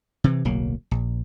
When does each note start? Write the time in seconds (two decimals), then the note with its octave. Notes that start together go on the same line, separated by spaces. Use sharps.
0.24 C3 E3
0.45 D1 B1 F#3 A#3
0.91 A#1